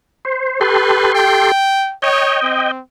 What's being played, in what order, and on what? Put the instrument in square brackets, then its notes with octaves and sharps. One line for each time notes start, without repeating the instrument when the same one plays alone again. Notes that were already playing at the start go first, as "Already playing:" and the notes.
[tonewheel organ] C5
[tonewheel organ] G4 A4 C6 [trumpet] B4
[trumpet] G5
[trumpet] C#5 [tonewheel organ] D#5 G5
[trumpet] C4